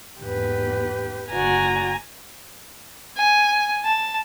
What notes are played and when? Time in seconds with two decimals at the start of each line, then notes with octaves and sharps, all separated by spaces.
0.21 E2 G#2 G4 B4
1.32 F#1 F#4 D5 G#5 A#5
3.17 G#5
3.84 A5